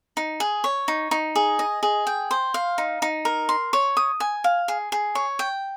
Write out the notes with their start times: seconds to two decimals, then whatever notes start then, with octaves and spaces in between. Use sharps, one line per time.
0.17 D#4
0.40 G#4
0.64 C#5
0.88 D#4
1.11 D#4
1.36 G#4
1.59 D#5
1.83 G#4
2.07 G5
2.31 C5
2.54 F5
2.78 D#4
3.02 D#4
3.25 A#4
3.49 C6
3.73 C#5
3.97 D#6
4.20 G#5
4.44 F5
4.68 G#4
4.92 G#4
5.15 C#5
5.39 G5